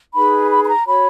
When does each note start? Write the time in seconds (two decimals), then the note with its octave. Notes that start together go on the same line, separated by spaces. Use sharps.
0.14 D#4 G#4 B4 B5
0.51 B5
0.64 B5
0.69 A#5
0.86 F#4 C#5 B5